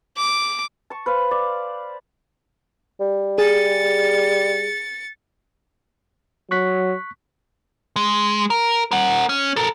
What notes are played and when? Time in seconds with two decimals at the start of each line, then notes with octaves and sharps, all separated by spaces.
0.17 D6
0.90 A5 C#6
1.06 B4 C5 F5
1.31 D5
3.00 G3
3.38 G#4 A6 C#7
6.51 F#3 C#6 F#6 B6
7.96 G#3
8.50 A#4
8.91 A#4 F#5
9.29 C#4
9.56 A4 A#4